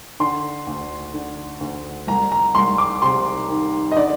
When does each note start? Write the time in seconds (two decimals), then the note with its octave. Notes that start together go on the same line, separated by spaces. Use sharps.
0.20 D3 C6
0.67 D2
1.14 D3
1.61 D2
2.07 C2 A#5
2.32 A#5
2.55 C2 C6
2.78 D6
3.02 C3 C6
3.49 D#3
3.92 D#5
3.96 D3 D5